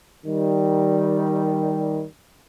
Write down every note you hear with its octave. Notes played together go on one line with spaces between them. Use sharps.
D#3 G3